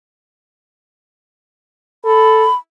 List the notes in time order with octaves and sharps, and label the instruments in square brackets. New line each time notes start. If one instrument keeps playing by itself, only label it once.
[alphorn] A4 [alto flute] B5